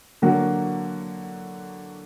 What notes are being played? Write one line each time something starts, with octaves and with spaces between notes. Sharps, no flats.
D3 F#3 A#3 F#4